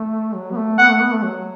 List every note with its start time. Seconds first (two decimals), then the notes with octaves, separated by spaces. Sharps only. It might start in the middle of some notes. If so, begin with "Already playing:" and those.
Already playing: A3
0.34 F#3
0.51 B3
0.57 A3
0.79 B3 F#5
0.89 A3
1.01 B3
1.12 A3
1.23 F#3